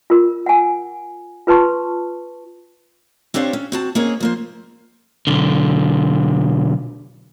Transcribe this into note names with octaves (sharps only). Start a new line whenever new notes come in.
F4 A#4
F#5 G#5
F4 B4 A5 C6 C#6
C4 D4 G4 C5 C#5 F5
C#4
C4 F#4 A5
A#3 C4 C#4 G#4 C#5 D#5
F3 A#3 C5
B1 D3